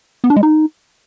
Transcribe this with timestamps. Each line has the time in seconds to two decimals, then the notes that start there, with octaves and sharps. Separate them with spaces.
0.24 B3
0.30 D4
0.36 G#3
0.43 D#4